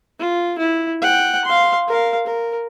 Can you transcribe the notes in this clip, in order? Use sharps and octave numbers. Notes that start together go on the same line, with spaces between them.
F4
E4
F#5 G5
F5 C6
A#4 F5
A#4